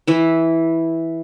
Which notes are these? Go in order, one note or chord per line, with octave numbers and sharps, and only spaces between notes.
E3 E4